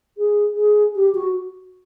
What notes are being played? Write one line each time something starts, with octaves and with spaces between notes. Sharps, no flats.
G#4
G#4
G4
F#4